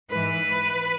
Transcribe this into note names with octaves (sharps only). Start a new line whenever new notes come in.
G#2 E3 B4